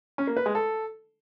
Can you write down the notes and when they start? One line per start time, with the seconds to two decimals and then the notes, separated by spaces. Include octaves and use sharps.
0.18 C#4
0.27 A#3
0.37 B4
0.46 G#3
0.55 A4